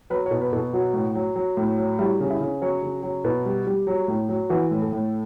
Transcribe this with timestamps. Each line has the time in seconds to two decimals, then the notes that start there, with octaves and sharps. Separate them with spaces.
0.10 F#3 B4
0.26 C#5
0.31 B2
0.41 B4
0.53 B2 A4
0.73 F#3 F#4
0.94 A2
1.15 F#3
1.36 F#3
1.57 A2
1.78 F#3
1.99 G3 E4
2.20 C#3
2.30 E4
2.40 C#3
2.62 F#3 C#5
2.82 C#3
3.03 F#3
3.24 B2 B4
3.45 G3
3.67 G3
3.87 F#3
4.08 A2
4.29 F#3
4.49 E3 F#4
4.71 A2
4.82 A4
4.92 A2